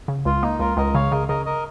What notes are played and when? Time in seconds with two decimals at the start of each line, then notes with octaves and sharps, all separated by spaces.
0.08 C#3
0.25 C#2 F4
0.43 A#3 D#4
0.59 C#2 F4 A#4
0.77 C#2 A#4 D#5
0.95 C#3 C#5 F5
1.11 C#3 A#4 D#5
1.28 C#3 A#4 D#5
1.46 A#4 D#5